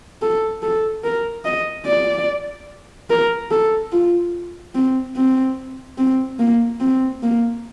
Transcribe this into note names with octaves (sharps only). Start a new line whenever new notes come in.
A4
A4
A#4
D#5
D5
A#4
A4
F4
C4
C4
C4
A#3
C4
A#3